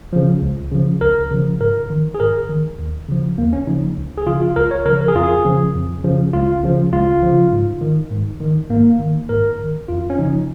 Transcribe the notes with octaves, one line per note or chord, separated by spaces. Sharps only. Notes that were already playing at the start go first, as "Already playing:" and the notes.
C#3 F3
C#2
C#3 F3
C#2 A#4
C#3 F3
G#2 A#4
D#3
G#4
G#2 A#4
D#3
D#2
C#3 F3
D#2 A#3
C#4
C#3 F3 D#4
C#2
G#4
C#3 F3 F4
F4
C#2 A#4
C#5
C#3 F3 A#4
A#4
G#4
F2 F4
G#4
C#3 F3
F2
C#3 F3
C#2 F4
C#3 F3
C#2 F4
C#3 F3
G#2
D#3
G#2
D#3
G#2 A#3
D#3
G#2 A#4
D#3
F2 F4
C#4
C#3 F3 D#4